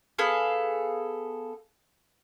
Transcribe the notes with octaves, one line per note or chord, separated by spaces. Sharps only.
B3 G#4 A4 F5